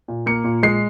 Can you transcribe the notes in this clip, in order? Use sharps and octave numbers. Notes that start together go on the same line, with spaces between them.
A#2
A#3 C#7
A#2
G#3 C7